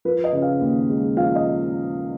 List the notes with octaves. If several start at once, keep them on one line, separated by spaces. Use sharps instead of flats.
F3 B4
D#5
C#3
F5
D#2
G#3
F3 F5
D#5